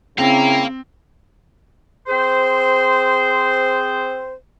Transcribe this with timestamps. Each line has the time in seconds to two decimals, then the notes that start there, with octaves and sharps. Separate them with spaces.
0.18 C#3 C4 E4 F5 G5 A#5
2.07 C4 G#4 C5